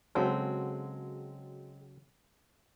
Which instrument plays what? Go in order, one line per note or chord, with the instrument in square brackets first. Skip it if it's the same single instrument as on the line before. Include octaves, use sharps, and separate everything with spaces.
[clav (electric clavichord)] C#3 F#3 A4 [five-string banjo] G#3 C4 F#4